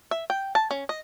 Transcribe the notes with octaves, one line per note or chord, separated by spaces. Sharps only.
E5
G5
A5
C#4
D#5